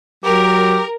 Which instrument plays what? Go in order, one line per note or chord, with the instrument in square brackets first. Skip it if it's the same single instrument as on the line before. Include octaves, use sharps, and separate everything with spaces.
[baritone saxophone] F#3 [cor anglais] G4 [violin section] A#4